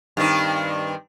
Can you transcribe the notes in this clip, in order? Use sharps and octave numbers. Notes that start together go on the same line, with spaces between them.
G2 D#3 C4